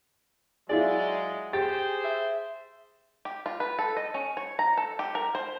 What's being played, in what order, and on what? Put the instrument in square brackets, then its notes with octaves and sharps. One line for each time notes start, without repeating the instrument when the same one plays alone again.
[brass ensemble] F#3 G#3 [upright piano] E4 F4 G#4 [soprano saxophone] D5
[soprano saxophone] G4 [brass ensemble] G#4 C5 [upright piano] A6
[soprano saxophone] E5
[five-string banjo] G4
F4
B4
A4
D#5
C#4
C#5
A#5
A4
G4
A#4
C5